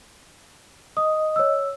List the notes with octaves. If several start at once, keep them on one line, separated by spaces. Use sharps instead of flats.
D#5 D#6
C#5 E6